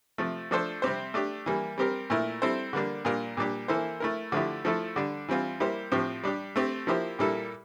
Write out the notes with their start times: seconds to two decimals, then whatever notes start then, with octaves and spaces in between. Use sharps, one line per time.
0.18 C3 F3 A3
0.51 F3 A3 D4 A4 C5
0.82 C3 G3 C4 G4 C5
1.14 A3 D4 G4
1.46 E3 G3 A#3
1.78 G3 C4 G4 A#4
2.10 A#2 A3 E4 A#4
2.42 G3 C4 E4 A4 C5
2.73 D3 G3 A#3 D4
3.05 A#2 G3 D4 F4 A#4
3.37 A#2 G3 D4 G4
3.68 E3 A#3 E4 A4 C5
4.00 A3 E4 A#4
4.32 D3 F3 A3 E4 G4
4.65 F3 A3 E4 A4
4.96 D3 G3 D4
5.28 E3 G3 C4 F4
5.60 G3 A#3 E4 G4 C5
5.92 A2 F3 C4 G4
6.24 G3 D4 G4
6.56 A3 C4 G4
6.87 F3 A#3 E4 G4 C5
7.19 A#2 G3 A#3 E4 A4